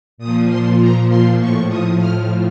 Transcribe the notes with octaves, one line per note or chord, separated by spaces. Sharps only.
A#2 D#6
F3
C6
A#5
C6
A2 F3 C#6
D#6
F6